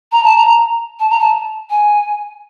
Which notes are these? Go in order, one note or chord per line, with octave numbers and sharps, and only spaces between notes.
A#5
A5
A#5
A5
A#5
A5
G#5